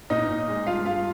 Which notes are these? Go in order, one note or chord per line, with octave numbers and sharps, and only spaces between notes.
A#2 D#4 D#5
A#2
G#3
G2 F4 F5
G2 F4 F5